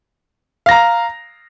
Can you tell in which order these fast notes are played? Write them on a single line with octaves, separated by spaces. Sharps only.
F5 A#6 A#5